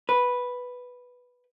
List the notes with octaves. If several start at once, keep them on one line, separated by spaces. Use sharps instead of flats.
B4